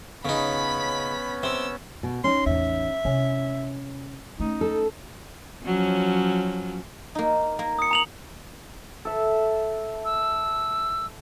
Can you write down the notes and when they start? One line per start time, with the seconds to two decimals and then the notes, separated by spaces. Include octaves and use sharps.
0.25 C#3 B3 C#4 D#4 B5 B6
1.43 C3 C4 E6
2.03 B2
2.24 C#4 D#4 C6
2.46 A1 E2 E5
3.05 C3 C#4 E4
4.40 A3 C#4 D#4
4.61 A4
5.64 F3 F#3 C#4
7.15 A#3 D#4
7.59 A#3
7.79 D#6 C#7
7.91 A#5 F7 F#7
9.05 A4 E5
10.05 E6